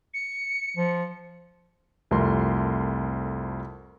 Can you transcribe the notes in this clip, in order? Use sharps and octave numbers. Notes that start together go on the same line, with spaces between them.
C#7
F3
C2 F2 A3 A#4 C6